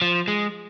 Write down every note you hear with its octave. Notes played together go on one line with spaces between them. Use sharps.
F3
G#3